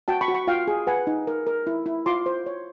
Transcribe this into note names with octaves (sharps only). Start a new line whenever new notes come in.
F#4 G5 A5
B5 C#6
F#4
B5 C#6
F4 F5 G5
G#4
B4 F#5 G#5
D#4
A#4
A#4
E4
E4
F4 C6 D6
C5
C#5